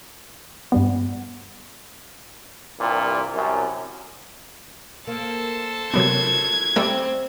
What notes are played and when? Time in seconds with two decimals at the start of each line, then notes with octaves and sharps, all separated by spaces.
0.72 G2 G3 B3
2.80 C2 G2 A#2
3.34 C2 F#2
5.07 A#3 A4 C5
5.94 C3 F#3 B3 A#4 G#6
6.76 G3 A3 C4 A4 C5